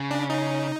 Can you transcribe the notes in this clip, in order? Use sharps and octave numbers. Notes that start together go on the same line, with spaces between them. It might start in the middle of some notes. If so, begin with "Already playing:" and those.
Already playing: C#3
D4
D#4